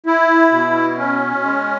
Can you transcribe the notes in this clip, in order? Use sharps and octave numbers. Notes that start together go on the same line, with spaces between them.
E4
B2
C#4
G#3